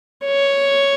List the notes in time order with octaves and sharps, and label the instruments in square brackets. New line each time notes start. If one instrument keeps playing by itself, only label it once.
[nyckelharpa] C#5